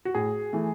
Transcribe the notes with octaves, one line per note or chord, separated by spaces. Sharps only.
F#4
A2 G#4
E3 A3